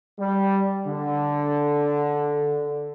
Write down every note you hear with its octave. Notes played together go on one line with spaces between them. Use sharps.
G3
D3